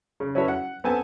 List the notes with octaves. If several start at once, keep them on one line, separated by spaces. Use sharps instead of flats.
C#3
C#4 E4 F#4 A4 B4 C#5
F#5
B3 C4 A4 G#5 A5